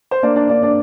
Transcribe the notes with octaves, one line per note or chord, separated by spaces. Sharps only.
C5
A#3 D4 D5
D4 D5
A#3 D4 D5
D4 D5